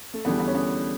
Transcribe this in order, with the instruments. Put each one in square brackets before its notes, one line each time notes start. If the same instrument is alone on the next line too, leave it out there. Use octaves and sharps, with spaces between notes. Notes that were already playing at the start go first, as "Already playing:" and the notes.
[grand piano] A3
E2 D3 G3 B3
B3
C#4
B3